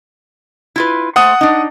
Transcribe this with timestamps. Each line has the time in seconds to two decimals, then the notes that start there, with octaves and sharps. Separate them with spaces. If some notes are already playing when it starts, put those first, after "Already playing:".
0.76 E4 F4 B4
1.16 A3 C5 F#5 D#6
1.41 D4 D#4